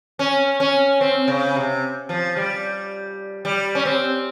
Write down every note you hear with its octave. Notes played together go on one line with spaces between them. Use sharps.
C#4
C#4
C4
C#3
C3
F3
G3
G3
C#4
C4